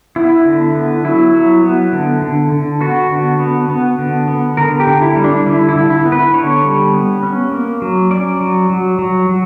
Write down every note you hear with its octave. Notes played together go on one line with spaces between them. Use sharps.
B3 E4
D3
B3
F#3 E4
F#3
B3
D3
D3
D3
B3 F#4
D3
B3
B3
D3
B3
D3 A#4
G4
D3
E4
G3
D4
D3 E4
E4
D3
E4
B3
B4
D3 C#5
G3
B3
C#4
A#3
F#3
C#4 D5
F#3
F#3
F#3
F#3